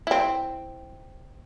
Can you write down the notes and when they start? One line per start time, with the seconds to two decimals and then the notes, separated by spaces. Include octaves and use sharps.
0.07 C4 E4